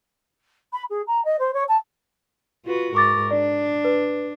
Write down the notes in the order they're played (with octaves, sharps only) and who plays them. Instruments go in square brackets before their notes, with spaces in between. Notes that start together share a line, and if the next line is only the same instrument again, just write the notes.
[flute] B5
G#4
A#5
D#5
C5
C#5
A5
[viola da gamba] F4 F#4 B4
[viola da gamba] G#2 A#4 [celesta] C#6 D6 A6
[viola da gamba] D4 [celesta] D5
[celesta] B4